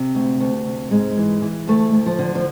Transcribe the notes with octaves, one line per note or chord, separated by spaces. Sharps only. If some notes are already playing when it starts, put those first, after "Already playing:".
Already playing: C3
D2
D2
C3
G#2 G#3
E3
E3
D2 A3
D2
F3
D3
F3